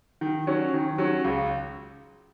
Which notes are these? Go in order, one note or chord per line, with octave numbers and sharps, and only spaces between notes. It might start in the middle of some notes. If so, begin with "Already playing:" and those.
D#3
F#3 C#4
D#3
F#3 C#4
C#2